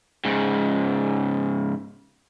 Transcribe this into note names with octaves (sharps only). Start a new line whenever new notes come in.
G#2 C#3